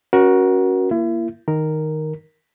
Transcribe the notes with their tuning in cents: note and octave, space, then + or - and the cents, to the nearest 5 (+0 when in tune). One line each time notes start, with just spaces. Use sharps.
C#4 +0 F#4 +5 A#4 +30
A#3 +0 E4 +35
D#3 +0 A#4 +0